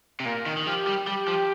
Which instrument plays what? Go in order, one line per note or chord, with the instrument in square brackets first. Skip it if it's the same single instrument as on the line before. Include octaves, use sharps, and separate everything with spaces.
[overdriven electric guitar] C3
[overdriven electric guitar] A#2 [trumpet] A#4
[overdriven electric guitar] D#3
D#3
[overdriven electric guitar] F3 [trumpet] G4
[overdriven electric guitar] G3
[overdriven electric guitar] G3 [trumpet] G4
[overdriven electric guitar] F3